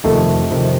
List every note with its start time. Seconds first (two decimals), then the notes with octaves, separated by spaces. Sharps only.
0.04 F2 C3 D#3 A3
0.51 F2 C3 D#3